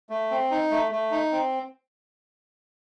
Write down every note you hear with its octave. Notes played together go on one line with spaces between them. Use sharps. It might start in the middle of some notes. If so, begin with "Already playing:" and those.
A3
C4
D#4
A3
A3
D#4
C4